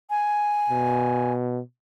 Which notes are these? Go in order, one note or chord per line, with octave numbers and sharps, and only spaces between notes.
G#5
B2